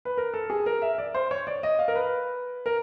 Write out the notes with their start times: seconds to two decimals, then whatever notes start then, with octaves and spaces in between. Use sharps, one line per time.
0.05 B4
0.17 A#4
0.34 A4
0.50 G#4
0.66 A#4
0.82 E5
0.98 D5
1.15 C5
1.31 C#5
1.47 D5
1.63 D#5
1.79 F5
1.88 A#4
1.96 B4
2.66 A#4